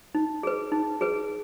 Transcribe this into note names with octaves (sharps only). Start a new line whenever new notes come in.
D#4
G#4 B4
D#4
G#4 B4